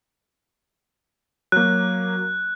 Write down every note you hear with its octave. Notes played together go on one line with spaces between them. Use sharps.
F#3 A#3 F#6